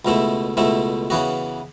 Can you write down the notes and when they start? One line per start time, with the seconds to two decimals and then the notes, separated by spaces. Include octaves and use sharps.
0.05 C#2 B2 A3 E4
0.57 C#2 B2 A3 E4
1.10 C#3 E3 B3 F#4